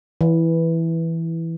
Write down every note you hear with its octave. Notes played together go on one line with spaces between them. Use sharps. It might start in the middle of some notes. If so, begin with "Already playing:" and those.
E3